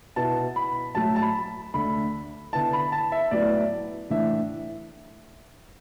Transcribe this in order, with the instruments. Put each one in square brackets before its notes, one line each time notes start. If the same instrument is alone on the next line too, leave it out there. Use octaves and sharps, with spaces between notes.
[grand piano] B2 B3 E4 A5
B5
A2 F#3 A3 A5
A5
B5
D2 D3 A3 D4 B5
D3 B3 E4 A5
B5
A5
E5
A2 F#3 B3 E4 D5
A2 E3 D4 E5